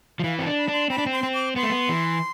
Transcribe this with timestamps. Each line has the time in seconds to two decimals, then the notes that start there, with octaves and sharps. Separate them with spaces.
0.19 F3
0.24 E3 F5
0.39 C4 A5
0.46 D4
0.58 B5
0.68 D4 C6
0.90 C4 B5
0.98 D4
1.06 C4
1.12 C6
1.23 C4
1.34 D6
1.56 B3 C6
1.63 A3
1.70 B3
1.89 E3